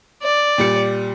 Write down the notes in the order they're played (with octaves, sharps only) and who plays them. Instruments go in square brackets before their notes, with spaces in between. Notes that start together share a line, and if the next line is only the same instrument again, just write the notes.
[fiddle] D5
[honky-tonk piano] A#2 G3 C#7